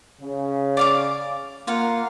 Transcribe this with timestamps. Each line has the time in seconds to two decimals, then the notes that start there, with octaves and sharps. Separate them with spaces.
0.20 C#3
0.77 D5 F5 D6
1.67 A#3 F4 F5 F#5